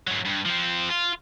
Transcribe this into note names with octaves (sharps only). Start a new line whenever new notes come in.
G#2 F#3
G2
F3 C4
F4